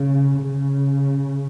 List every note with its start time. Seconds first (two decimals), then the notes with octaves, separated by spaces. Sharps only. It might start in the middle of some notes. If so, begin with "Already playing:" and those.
Already playing: C#3
0.41 C#3